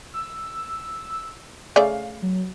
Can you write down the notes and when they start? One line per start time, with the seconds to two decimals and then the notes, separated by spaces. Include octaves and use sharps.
0.14 E6
1.76 C#3 A3 D5 F5
2.22 F#3